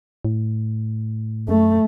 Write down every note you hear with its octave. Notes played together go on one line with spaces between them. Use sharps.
A2
F#2 A3